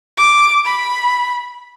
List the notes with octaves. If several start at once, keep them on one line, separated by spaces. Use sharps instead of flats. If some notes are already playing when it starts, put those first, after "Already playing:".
D6
B5